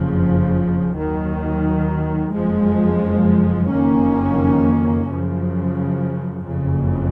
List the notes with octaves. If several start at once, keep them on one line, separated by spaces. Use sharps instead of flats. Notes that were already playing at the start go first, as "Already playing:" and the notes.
Already playing: F#1 F2 C#3 F3
D#2 D#3 F#3
F#1 F2 F3 G#3
F#1 F2 D#3 A#3 C#4
F#2 C#3 F3
F#1 F2 C#3